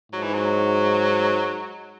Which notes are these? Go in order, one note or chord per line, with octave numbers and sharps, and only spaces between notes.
G#2 F#3
E3
F#3